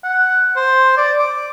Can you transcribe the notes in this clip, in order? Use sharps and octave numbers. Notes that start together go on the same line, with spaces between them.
F#5
C5
D5
D6